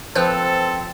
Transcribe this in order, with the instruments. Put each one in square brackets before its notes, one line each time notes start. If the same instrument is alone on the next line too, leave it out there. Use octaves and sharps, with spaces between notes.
[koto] F3 [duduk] C4 [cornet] A4 [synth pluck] B4 C5